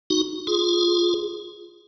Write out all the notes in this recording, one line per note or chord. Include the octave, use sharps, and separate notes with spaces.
D#4 F#4
F4 G#4